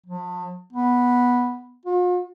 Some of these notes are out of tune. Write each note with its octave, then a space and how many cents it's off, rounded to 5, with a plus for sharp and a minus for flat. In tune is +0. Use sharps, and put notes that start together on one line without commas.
F3 +40
B3 -5
F4 +45